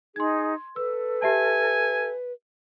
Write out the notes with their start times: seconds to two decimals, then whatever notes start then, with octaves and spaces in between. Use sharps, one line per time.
0.16 D#4 G#4 C6 G#6
0.76 A4 B4 E6
1.22 G4 E5 G#5 A5